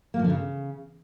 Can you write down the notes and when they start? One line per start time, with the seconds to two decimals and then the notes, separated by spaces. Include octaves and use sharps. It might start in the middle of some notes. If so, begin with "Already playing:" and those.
0.14 A#3
0.19 F3
0.24 D3
0.30 C#3